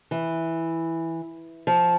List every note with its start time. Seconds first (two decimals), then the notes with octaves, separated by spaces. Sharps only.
0.11 E3
1.67 F3